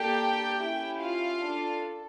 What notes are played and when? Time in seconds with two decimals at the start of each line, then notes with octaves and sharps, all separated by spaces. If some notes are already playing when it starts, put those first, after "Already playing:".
Already playing: A#3 D4 G4 A4 G5
0.62 C#4 E4 G4
1.01 F4 F5
1.40 D4 A4